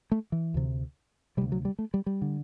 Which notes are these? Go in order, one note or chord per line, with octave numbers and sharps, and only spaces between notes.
A3
E3
D2 C3
D2 C3 G3
F#3
G3
A3
G3
G3
D3